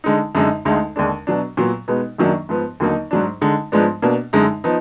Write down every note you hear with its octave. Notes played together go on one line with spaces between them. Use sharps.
D3 G#3 D#4
F#2 D3 G#3 D#4
D2 D3 G#3 D#4
D#2 D3 G#3 D4
B2 F#3 D4
A#2 F#3 B3
B2 G#3 B3 D#4
F#2 D#3 F#3 A#3 D4
G#2 F3 B3
D#2 D3 F#3 A#3 D#4
G#2 F#3 D4
D3 G#3 D#4
G#2 F3 G#3 B3 D4
B2 A#3 D4
F#2 D3 G#3 D#4
F3 B3 D#4